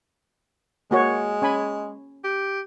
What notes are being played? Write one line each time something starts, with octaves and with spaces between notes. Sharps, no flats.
G#3 A#3 F#4 C#5
C#4 G#5 B5
G4